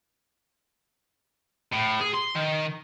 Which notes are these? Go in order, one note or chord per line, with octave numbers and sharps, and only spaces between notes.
A2
G#4
C6
D#3